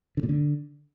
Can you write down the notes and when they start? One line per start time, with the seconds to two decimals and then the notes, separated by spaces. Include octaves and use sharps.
0.17 D3
0.23 A#2
0.29 D3